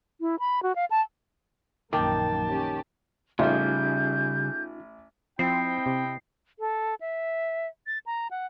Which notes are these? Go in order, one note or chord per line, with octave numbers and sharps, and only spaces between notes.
E4
B5
F#4
F5
A5
A#1 F#2 D#3 A#3 G5 A5 D6
C#4 G4
A1 C#3 G3 C#4 D#4 F4 G#4 G6
F3 C4 E4 D#5 G5 C7
C3
A4
E5
A6
A#5
F#5